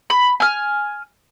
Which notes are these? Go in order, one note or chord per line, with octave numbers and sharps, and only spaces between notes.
B5
G#5 F6